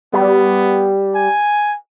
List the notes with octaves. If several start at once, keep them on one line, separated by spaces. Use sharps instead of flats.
G3 B3
G#5